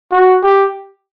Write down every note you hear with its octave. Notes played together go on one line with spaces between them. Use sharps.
F#4
G4